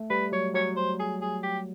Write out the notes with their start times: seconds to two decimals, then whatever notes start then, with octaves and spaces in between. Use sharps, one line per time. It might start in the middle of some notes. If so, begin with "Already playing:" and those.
Already playing: A3
0.10 G3 B4
0.32 F#3 C#5
0.54 F#3 C#5
0.76 C5
0.99 G#4
1.21 G#4
1.43 G4